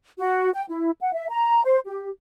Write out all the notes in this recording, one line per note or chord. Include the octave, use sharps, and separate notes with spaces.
F#4
G5
E4
F#5
E5
A#5
C5
G4